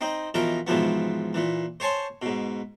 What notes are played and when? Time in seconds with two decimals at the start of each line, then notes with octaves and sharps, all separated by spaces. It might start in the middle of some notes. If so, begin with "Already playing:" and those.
0.01 C4 D#4 D#5
0.34 B2 E3 F3 A#4 D#5 A#5
0.67 G#2 B2 E3 F3 B3
1.34 A#2 E3
1.80 C5 C#5 G#5 A5 C6
2.22 G#2 B2